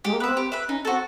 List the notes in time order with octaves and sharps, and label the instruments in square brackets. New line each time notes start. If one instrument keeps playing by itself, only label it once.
[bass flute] G#3 [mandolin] G4
[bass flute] A#3
[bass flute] B3 [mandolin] B4
[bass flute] C4 [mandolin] E5
[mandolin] G4
B4 E5
[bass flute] C#4 [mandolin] D#4
[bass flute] C4 [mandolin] F#4 A4